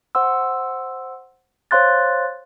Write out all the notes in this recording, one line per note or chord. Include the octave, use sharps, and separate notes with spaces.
C5 F#5 C6 E6
C5 C#5 F5 C6 F#6 A6